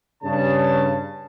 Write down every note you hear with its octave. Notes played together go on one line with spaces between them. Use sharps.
G2 C#3 A5